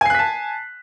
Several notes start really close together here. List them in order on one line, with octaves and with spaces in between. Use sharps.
G#5 C7 F#6 B6 A5